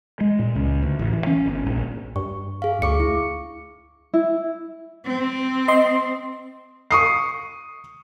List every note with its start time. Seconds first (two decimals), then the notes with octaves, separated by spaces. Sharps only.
0.21 G#3
0.39 A#2
0.55 C#2
0.83 D2
0.99 A1
1.13 E3
1.27 C#4
1.45 G1
1.66 A#1
2.16 G2 C#6
2.62 G#4 F5
2.82 D2 C#6 D6 C#7
3.00 E4
4.14 E4
5.05 C4
5.68 D#5 C6
6.91 C#6 D#6 C7